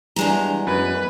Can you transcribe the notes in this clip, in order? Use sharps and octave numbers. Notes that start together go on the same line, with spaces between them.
E2 E3 G3 G#3 D4 A#5
F#2 B4